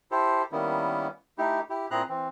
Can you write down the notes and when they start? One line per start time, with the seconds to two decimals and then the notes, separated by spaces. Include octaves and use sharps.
0.11 E4 G4 A4 C5
0.52 D#3 G3 A#3 B3 C#4 E4
1.38 A3 D#4 E4 G4
1.70 E4 G4
1.91 A#2 C4 E4 G#4 A#5 F#6
2.09 E3 C4